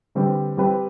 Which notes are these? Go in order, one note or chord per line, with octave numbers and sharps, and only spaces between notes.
D3 G3 C4 G4 B4
G3 C4 G4 B4